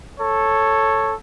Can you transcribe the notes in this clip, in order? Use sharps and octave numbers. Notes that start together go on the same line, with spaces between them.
A4 C#5